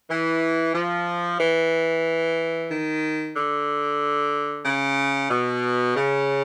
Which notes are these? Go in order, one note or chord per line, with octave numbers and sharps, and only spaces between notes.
E3
F3
E3
D#3
D3
C#3
B2
C#3